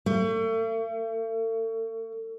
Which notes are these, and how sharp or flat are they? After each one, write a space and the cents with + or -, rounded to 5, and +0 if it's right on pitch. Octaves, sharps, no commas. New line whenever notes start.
A3 +40